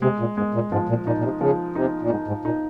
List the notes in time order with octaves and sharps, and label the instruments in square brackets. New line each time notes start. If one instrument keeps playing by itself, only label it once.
[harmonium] C3 [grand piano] G#3
[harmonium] A#2
[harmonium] G#2 [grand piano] G#3
[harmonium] A#2
[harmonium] G#2 [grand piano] F3
[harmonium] A#2
[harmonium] A#2 [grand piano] D#4
[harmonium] A#2
C3
[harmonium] C#3 [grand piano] F3
[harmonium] C3 [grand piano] D#4
[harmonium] A#2
[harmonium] G#2 [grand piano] D#4
[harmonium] G#2
[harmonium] A#2 [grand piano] D#4